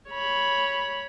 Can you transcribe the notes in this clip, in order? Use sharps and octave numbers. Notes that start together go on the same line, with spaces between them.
C#5 B5